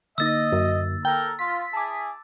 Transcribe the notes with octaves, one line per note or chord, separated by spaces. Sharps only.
D3 A#3 D#4 D#5 E6 A6
F#2
A4 A#4 G5
F4 B6
E4 G#4 A5 D6